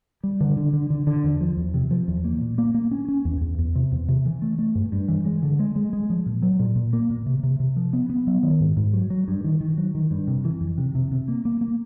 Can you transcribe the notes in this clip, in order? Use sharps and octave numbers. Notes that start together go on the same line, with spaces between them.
G3
D3
D3
D3
D3
D3
E2
F3
E2
C3
F3
E2
A#3
A#2
A#3
A#3
C#4
C#4
E2
E2
E2
C3
E2
C3
E3
A3
A3
G2
G2
E3
G#3
D3
G#3
G#3
G#3
F3
A#2
F#3
A#2
A#2
A#3
A#2
C3
C3
C3
F3
B3
B3
F#3
D#3
G#2
G#2
F#3
F#3
G2
D#3
D#3
F#3
D#3
G2
C3
E3
F2
C3
C3
C3
A#3
A#3
A#3